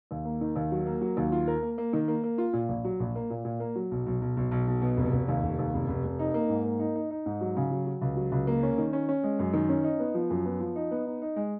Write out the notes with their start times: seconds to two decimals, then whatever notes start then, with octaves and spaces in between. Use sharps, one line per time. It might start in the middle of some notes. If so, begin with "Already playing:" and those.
0.11 D#2
0.25 A#3
0.41 D#3
0.56 D#2
0.72 F#3
0.86 A#3
1.01 F#3
1.17 D#2
1.32 F4
1.47 A#4
1.63 A#3
1.78 A#3
1.93 D#3
2.08 A#3
2.24 A#3
2.38 F4
2.53 A#2
2.69 A#1
2.84 F#3
3.00 A#1
3.15 A#3
3.30 A#2
3.45 A#2
3.60 A#3
3.76 F#3
3.91 B1
4.06 B1
4.22 B1
4.37 B1
4.51 B1
4.68 B1
4.82 B2
4.97 F1
5.13 F1
5.28 D#2
5.43 F1
5.59 D#2
5.74 F1
5.88 F1
6.04 F1
6.19 D#4
6.34 A#3
6.49 G#2
6.64 A#3
6.80 D#4
6.95 D#4
7.11 D#4
7.26 G#2
7.41 F#3
7.56 C#3
7.71 F#3
7.86 F#3
8.01 C#2
8.16 F#3
8.32 C#2
8.47 A#3
8.63 C#4
8.78 D#3
8.93 C#4
9.09 C#4
9.24 G#3
9.39 F#2
9.53 D#3
9.69 C#4
9.84 D#4
9.99 B3
10.15 F3
10.30 F#2
10.45 B3
10.60 F3
10.76 D#4
10.91 B3
11.06 D#4
11.22 D#4
11.36 G#3